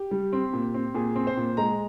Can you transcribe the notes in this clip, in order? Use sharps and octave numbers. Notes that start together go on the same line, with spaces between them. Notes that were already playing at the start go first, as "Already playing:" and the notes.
Already playing: G4
G3
C4
A#2
C4
A#2 G#4
C4
C5
A#2
G#3 A#5